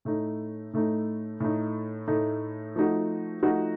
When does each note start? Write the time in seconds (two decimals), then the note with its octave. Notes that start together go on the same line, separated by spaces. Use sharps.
0.05 A2 A3 D#4
0.73 A2 A3 D#4
1.40 A2 A3 D#4
2.08 A2 A3 D#4
2.76 F3 A3 D#4 F#4
3.43 F3 A3 D#4 F#4